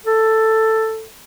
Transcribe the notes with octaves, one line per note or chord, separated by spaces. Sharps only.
A4